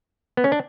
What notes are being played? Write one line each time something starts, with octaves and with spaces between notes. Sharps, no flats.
B3
C#4
D4